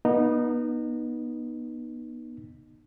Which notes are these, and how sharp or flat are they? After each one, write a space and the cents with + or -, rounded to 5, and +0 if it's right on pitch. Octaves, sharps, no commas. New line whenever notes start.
B3 -30 D#4 -20